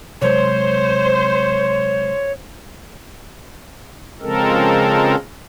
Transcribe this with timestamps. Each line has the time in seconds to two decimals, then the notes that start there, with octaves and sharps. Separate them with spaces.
0.22 C3 F#3 G#3 C5 C#5
4.21 C#3 F3 G#3 C4 A4 A#4